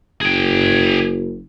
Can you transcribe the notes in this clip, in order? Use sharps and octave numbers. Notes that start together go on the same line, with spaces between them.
F#1 G#4 G5